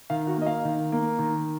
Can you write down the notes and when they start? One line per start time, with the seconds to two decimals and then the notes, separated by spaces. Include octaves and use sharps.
0.10 D#3 F5
0.27 F#4
0.37 A#3 D#5
0.46 F5
0.65 D#3
0.92 A#3
1.19 D#3